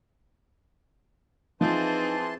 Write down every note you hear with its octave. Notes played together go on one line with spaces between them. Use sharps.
E3 F3 C4 D#4 G#4 A5 C6